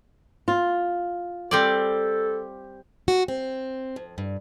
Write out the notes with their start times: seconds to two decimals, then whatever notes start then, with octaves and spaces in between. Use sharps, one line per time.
0.48 F4
1.51 G3 C4 A4 D5
3.08 F#4
3.28 C4
3.96 F2
4.18 G2